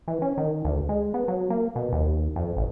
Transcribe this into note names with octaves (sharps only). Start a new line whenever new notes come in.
E3
C#4
D#3
D2
G#3
B3
F#3
A#3
B2
D#2
F2
A1